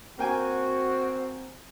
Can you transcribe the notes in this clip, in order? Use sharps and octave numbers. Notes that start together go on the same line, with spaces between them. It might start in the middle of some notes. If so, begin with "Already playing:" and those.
A#3 C4 F#4 G5 G#5